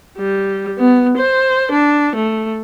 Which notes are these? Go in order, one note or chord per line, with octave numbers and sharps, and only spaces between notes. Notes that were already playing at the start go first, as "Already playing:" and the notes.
G3
B3
C5
D4
A3